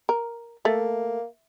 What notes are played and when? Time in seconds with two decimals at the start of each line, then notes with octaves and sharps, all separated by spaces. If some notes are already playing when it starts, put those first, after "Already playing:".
0.09 A#4
0.65 A3 A#3